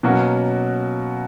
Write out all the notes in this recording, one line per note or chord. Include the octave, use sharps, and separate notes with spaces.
B2 F#3 A#3 C#4 F#4